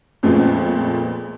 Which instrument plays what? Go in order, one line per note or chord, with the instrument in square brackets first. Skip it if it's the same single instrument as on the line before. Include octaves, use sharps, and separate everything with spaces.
[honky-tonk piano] F2 A#2 F3 G#3 A3 B3